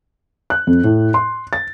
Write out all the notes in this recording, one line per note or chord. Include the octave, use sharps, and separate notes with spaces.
F#6
F2
A2
C6
A6